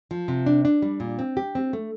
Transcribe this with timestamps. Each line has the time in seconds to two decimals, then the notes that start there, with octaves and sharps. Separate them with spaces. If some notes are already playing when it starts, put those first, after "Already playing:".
0.11 F3
0.28 C3
0.46 D4
0.65 D4
0.82 G3
1.00 A#2
1.19 C4
1.37 G4
1.55 C4
1.73 A3